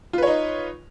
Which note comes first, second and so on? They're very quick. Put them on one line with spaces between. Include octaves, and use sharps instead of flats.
F4 B4 C#5 D#4